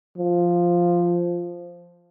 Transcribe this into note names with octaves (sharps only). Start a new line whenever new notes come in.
F3